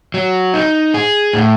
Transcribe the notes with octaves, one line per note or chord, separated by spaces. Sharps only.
F#3
D#4
G#4
A2